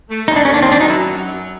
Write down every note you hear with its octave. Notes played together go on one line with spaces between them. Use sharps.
A3
D#2 D#4
D4
D#2 C#4
D4
D#3 C4
D4
F#3 D#4
E4
F#2
F#3
F#2